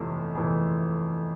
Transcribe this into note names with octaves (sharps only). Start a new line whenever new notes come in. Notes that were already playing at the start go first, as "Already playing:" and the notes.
Already playing: G1 F2 C3 E3 A3
G1 F2 C3 E3 A3